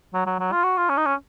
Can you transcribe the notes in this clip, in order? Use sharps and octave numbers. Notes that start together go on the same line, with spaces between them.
F#3
F#3
F#3
F4
F#4
F4
C#4
D#4
C#4